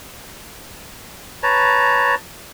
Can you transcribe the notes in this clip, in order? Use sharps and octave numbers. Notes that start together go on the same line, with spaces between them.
B4 C#5 A5 A#5